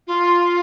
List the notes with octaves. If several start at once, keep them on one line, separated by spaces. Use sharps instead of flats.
F4